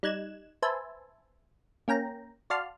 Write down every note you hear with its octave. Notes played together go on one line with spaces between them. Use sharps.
G3 D#4 F#6 G#6 E7
B4 C5 E5 G#5 A5
A#3 C#4 G5 A#5
F#4 D5 F5 A5 C6 F6